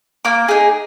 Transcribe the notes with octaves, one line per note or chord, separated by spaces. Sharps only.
A#3 D6
D#4 G#4